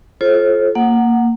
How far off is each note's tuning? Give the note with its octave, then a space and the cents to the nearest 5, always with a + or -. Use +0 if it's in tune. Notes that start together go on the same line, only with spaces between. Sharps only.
F4 +0 A4 -25 C5 +35
A#3 -10 F#5 +0